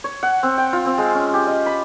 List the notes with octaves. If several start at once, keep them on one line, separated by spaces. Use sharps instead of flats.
C#5
F#5
C4
G5
F4
C4
G#3
C#4
G4
D#5
B5